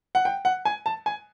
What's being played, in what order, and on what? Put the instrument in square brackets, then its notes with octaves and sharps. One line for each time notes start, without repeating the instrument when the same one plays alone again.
[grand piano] F#5
G5
F#5
G#5
A5
G#5